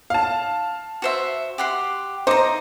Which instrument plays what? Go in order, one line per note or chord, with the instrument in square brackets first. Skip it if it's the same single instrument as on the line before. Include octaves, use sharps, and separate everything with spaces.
[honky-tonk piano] F5 A5
[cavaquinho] F#4 C5 E5
G4 F#5 C6
[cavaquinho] D#4 A#5 [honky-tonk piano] C5 D6